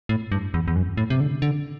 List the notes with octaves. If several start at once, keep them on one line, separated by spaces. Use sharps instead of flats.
A2
G2
E2
E2
F#2
A2
C3
D3
D3